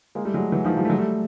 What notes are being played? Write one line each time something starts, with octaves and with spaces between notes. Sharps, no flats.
G#3 A#3
G3 A3
F#3 G#3
E3 F#3
D#3 F3
F3 G3
A3
F#3 G#3
G3 A3